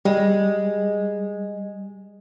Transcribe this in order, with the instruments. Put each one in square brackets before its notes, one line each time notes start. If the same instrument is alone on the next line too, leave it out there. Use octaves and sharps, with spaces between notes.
[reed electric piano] G3 [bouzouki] G#3